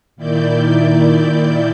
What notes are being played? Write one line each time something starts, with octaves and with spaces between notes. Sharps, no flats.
A#2 D#3 E4 D5 G6